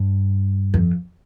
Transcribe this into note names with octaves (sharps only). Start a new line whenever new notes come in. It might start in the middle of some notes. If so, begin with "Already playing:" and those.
Already playing: G2
F2